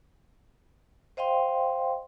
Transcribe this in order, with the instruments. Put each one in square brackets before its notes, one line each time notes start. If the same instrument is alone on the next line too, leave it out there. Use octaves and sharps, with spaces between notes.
[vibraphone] C5 D#5 F5 G5 C6